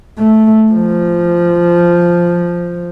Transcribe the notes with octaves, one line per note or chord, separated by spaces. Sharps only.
A3
F3